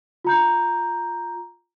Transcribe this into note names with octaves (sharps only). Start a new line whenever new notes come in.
F4 A#5 G6